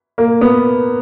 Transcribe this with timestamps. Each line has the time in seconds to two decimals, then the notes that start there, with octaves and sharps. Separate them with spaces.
0.18 A#3
0.41 B3